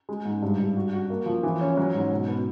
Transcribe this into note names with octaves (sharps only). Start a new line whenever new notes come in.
G#3
G#2
G2
G2
F#4
F#4
A#3
F3
E3
C#4
F#3
G#2
B2
B3